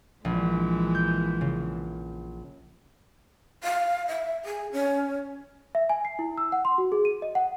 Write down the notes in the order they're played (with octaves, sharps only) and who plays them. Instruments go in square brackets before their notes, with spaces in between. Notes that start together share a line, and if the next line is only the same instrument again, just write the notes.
[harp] A#1 [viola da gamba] E3 G#3
[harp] G6
C#3
[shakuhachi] F5
E5
G#4
C#4
[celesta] E5
G#5
C7
E4
E6
F#5
C6
F#4
G#4
D#7
D#5
F#5